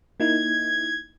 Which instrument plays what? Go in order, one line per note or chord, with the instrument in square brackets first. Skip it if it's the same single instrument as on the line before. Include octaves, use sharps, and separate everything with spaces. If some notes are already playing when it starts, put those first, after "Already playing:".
[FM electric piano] A#3 D#4 E4 [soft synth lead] G#6